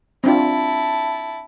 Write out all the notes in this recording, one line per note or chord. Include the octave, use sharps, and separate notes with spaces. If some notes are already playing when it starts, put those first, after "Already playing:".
C4 D4 E4 F4 A5